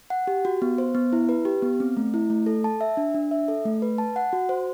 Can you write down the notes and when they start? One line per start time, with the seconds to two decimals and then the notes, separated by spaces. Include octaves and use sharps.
0.10 F#5
0.27 G4
0.45 F#4
0.62 B3
0.78 C5
0.95 B3
1.13 E4
1.29 B4
1.45 G4
1.62 B3
1.80 C4
1.97 A3
2.14 E4
2.30 A3
2.46 A4
2.64 A5
2.81 E5
2.97 D4
3.14 D4
3.31 E5
3.48 A4
3.65 A3
3.82 B4
3.98 A5
4.16 F#5
4.33 F#4
4.49 C5